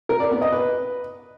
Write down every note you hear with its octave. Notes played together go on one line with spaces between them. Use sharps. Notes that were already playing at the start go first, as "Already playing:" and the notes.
A#4
D5
B3
D#5
B4